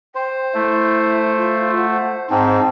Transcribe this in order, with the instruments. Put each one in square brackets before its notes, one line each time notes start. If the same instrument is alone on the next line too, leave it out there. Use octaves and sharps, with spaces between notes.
[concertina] C5 [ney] G5
[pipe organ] A3 [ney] E4
[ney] F4
[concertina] C5 [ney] F#5
[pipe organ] G#2 [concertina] C4 [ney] A5